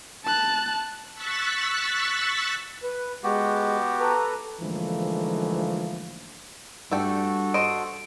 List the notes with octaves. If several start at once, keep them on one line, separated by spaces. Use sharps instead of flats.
A5 F#6
C#6 E6 F#6 A6 B6
B4
G#3 B3 F#4 G4
A4 B4 A#5
G#2 D3 E3 F3 A3 A#3
G2 A3 F#4 A4 D5 G5
C5 D#5 D7